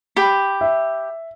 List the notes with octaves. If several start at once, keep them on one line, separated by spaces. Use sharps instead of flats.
G4 B5
E5